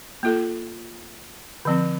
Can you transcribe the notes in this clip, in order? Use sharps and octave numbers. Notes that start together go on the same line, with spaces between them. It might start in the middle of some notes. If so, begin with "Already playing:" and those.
A#3 F4 A4
D3 F3 C4